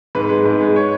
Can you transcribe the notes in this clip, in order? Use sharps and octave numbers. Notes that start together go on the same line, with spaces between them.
G#2 B4
G#3
G#2
G#3
C#5